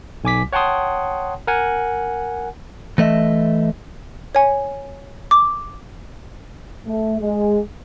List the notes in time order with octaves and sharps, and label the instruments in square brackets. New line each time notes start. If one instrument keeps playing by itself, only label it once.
[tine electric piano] B1 G#5 D6 B6
C#5 F#5 G5 A5 C6 D#6
A#4 F#5 G#5
[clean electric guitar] E3 A3 D#5 E5
[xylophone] C#5 G#5
D6
[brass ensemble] A3
G#3